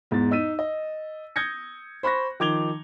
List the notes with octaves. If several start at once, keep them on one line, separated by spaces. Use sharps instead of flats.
E2 G#2 B2 A6
D#4 E6 B6 D#7
D#5
D#6 G6 G#6 A#6 C#7
C5 B5 C#6 F#6 A#6
D#3 F3 D6 G#6 F7 G7